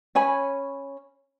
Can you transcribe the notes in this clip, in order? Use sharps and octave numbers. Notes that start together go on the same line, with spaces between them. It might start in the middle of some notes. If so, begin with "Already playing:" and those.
C#4 C#5 G#5 B5